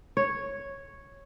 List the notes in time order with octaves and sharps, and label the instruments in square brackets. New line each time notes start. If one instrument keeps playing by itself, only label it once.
[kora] C#5